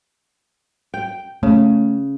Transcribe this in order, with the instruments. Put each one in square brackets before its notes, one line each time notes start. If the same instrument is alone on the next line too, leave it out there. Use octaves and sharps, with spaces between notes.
[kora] G5
[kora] C#3 [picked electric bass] A3